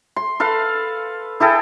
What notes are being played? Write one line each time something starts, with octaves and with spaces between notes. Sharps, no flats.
C6
A4 B4 F5
E4 G#4 A4 G5